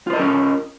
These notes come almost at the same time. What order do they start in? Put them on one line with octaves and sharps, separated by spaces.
F4 C5 D#5 A#4 C#4